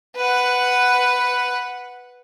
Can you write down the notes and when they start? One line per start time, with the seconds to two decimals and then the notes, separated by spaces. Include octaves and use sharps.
0.16 B4 F#5